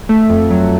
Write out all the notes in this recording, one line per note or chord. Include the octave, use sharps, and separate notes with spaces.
A3
F2
F#3